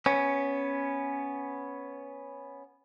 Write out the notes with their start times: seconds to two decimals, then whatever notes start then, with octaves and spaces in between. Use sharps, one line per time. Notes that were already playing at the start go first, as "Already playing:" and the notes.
0.06 B3 C#4